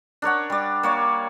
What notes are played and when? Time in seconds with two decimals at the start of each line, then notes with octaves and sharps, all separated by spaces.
0.22 D4 A#4 C#5 F#5
0.50 G3 D5
0.83 A#3 C#5 D5